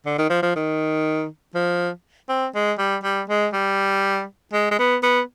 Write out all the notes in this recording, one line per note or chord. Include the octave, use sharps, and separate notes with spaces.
D3
D#3
F3
F3
D#3
F3
C4
G#3
G3
G3
G#3
G3
G#3
G#3
B3
B3